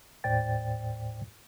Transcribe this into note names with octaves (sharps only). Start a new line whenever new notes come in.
D#2 A2 C5 D5 G5 A6